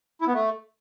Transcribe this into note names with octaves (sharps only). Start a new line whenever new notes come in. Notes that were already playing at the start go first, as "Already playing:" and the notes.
E4
B3
A3